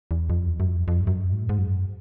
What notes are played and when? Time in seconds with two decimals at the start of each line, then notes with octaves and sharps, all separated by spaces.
0.11 E2
0.30 F2
0.48 E2
0.60 F#2
0.68 F2
0.88 F2
1.01 G2
1.07 F#2
1.32 G#2
1.42 A2
1.49 G#2
1.58 F#2